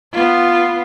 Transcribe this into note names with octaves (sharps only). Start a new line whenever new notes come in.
B3 F4